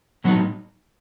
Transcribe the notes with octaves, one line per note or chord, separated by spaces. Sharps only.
A2 F#3 B3 D#4